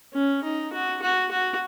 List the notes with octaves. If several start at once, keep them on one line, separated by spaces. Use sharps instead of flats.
C#4
D#4
F#4
F#4
F#4